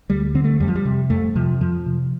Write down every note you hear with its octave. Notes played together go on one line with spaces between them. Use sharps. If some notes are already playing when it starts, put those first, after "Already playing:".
D2 G3
D3 C4
A3
F2 G3
F3
G3
C3
F2 A3
C3 F3
F2 F3
C3